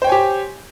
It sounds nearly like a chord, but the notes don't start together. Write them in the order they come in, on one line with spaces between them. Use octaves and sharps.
C5 G5 C#5 G#5 G4